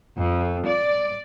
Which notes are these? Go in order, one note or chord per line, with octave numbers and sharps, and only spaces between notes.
F2
D5